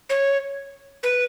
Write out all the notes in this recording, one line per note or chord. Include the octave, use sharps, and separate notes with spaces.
C#5
B4